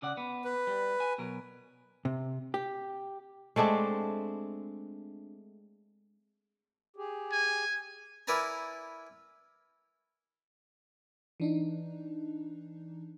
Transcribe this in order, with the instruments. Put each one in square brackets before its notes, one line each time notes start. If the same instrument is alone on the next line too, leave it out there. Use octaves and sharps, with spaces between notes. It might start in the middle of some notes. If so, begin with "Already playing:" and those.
[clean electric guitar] C#3 D5 F#5
B3
[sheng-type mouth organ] B4
[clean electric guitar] G3
G#5
B2 F#3 A#4
[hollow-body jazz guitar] C3
G4
[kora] G#3 A3 C4 D4
[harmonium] G4 G#4
[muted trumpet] G#5
[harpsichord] E4 A#4 B4 D5 G#5 A#5
[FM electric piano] E3 D4 D#4